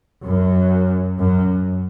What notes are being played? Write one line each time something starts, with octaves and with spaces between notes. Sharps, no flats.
F#2
F#2